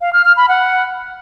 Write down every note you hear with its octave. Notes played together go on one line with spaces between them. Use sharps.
F5
F6
F6
B5
F#5